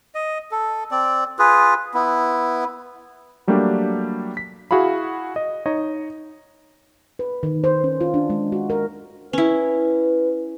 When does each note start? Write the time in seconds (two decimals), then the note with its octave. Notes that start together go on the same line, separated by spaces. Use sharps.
0.15 D#5
0.51 A4
0.91 C4 D5
1.39 F4 G#4 B4
1.94 B3 E4
3.47 F#3 G3 A3 A#3 D4 G4
4.37 B6
4.71 E4 F#4 G#4 F5 B5
5.36 D#5
5.66 D#4 C#5 D#5
7.19 B4
7.43 D#3
7.64 C5
7.84 C#4
8.01 F4
8.14 D4
8.30 G#3
8.52 F#4
8.70 A#4
9.33 C#4 E4 B4